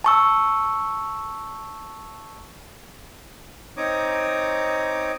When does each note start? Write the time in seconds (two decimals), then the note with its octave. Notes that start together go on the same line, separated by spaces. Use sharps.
0.04 A5 C#6 E6
3.77 C4 D#4 C#5 A#5 D6 D#6